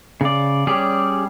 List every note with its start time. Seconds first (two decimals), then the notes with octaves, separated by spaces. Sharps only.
0.21 C#3 D5
0.67 G3 C#4 G4 G#4 D5